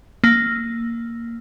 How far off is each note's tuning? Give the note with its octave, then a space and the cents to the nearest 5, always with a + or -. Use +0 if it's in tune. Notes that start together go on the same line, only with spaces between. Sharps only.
A#3 -5